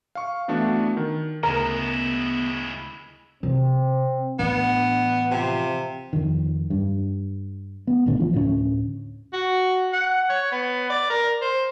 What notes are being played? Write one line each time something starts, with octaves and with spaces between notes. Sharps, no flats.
F5 C#6
E3 A3 B3 D4 F#4
D#3
D2 C#3 G#3 B3 E4 A#4 F#5
C3 C4
A1 B3 D4
C3 F3
F2 D#3
G2
B3
A#1 A2 D3 D#3
F3
D2 A2 F#3 C#4
F#4
F#5
C#5
B3
D5
A#4
C5